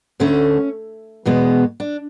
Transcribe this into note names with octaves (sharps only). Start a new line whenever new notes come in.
D2 D3 A3 C#4
E2 B2 G#3 B3
D4